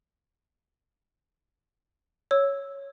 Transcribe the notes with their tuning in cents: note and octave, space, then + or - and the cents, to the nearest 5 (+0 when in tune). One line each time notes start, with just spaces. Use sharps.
C#5 +0 E6 +0